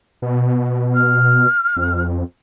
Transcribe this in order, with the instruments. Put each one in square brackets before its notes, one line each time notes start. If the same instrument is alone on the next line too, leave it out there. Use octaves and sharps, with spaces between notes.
[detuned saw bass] B2
[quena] F6
[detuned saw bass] F2